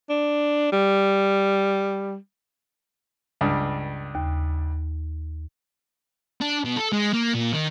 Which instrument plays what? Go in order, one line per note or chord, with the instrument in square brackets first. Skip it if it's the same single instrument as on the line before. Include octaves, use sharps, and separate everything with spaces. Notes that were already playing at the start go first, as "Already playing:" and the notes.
[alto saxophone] D4
G3
[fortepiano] C#2 G2
[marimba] D#2
[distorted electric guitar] D4
B2
A4
G#3
A#3
A#2
D#3